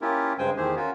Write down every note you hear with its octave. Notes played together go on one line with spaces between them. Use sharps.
A#3 C#4 E4 F4 G4 A#4
G2 C#3 G#3 C5 G5 G#5
E2 D#3 A3 G4 G#4 C5
C#4 F4 F#4 A#4